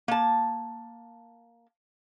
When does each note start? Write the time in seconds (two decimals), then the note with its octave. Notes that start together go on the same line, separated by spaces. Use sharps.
0.08 A#3 A5